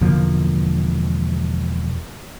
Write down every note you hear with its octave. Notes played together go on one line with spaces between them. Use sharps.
E1 D3 F3 A#3